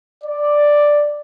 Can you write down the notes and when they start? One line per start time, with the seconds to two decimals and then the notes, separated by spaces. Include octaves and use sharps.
0.24 D5